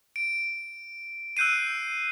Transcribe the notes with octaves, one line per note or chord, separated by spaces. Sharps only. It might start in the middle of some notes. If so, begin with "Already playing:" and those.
D7
E6 F#6 G6 C7 D#7